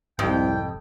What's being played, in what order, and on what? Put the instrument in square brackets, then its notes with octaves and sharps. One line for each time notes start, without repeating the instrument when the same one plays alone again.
[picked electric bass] F1 G#2 [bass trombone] C2 [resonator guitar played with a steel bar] F2 [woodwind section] G5